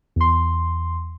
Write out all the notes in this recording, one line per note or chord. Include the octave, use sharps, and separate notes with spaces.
E2 C6